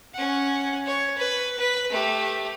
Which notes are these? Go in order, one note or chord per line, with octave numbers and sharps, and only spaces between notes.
C#4 F#5
C#5
B4
B4
A3 G4